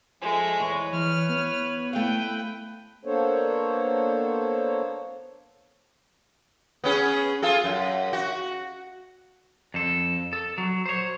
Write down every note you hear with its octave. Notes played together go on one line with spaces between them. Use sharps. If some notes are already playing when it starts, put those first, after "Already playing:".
F3 G#3 A3 G#5
E2 B4 C#5 C#6
E3 F6
B3
A3 E4 B4 F5 G5
A#3 B3 D4 A4 C5 C#5
B3 C#4 G#4
F4 G#4 A4
F#2
F#4
F2 A4
A4
F#3
C5 C#5